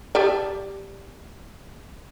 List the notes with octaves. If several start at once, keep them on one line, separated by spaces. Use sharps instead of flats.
G4 A4 D5